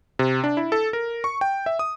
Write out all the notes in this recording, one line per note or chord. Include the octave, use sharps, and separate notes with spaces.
C3
D4
E4
A4
A#4
C#6
G5
E5
D#6